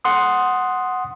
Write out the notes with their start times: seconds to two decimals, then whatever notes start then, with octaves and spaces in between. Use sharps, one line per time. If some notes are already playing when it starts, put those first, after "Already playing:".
0.05 F#5 C6 D#6